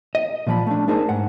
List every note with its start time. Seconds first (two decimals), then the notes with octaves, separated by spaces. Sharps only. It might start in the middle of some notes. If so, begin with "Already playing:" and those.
0.15 D#5
0.47 A#2 F3 B5
0.67 A3 D4
0.88 A3 D4 D#4 G#4 A#4 C5
1.09 G#2 F#5